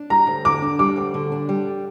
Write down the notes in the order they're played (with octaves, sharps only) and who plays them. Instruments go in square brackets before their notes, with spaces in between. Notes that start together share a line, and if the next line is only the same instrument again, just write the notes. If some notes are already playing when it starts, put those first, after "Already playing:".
Already playing: [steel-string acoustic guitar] D4
[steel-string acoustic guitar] G3 [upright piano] A#5
[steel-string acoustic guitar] D2
[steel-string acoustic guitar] D3 [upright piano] D6
[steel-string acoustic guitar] D4
[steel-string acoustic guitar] G3 [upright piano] D6
[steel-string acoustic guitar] D2
D3
D4
G3